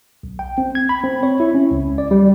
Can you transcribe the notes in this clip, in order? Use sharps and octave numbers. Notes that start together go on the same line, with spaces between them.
B1
G5
C4
G#6
B5
C4
C#5
E4
C#4
C#2
D5
G3